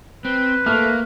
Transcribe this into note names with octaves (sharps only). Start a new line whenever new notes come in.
C4 B4
A3 A#3 F6